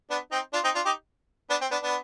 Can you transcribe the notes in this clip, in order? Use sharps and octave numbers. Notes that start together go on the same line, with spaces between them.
B3 D4
C4 D#4
D4 F4
C4 D#4
D4 F4
D#4 G4
B3 D4
C4
B3 D4
B3 D4